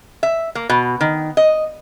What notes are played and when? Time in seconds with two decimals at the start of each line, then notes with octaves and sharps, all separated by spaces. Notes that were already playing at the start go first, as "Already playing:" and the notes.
0.23 E5
0.55 A#3
0.69 B2
1.01 D#3
1.37 D#5